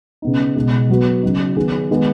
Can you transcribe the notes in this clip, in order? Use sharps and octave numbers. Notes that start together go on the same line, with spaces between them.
C#3 B3 D#4
B2 G#3 D#4
F#3 B3 F#4
C#3 F#3 D#4
D#3 B3 G#4
D#3 G#3 B3 G#4